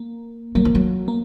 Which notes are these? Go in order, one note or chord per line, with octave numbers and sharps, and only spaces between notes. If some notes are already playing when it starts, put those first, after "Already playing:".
Already playing: A#3
F#3 A#3
F3
F#3
A#3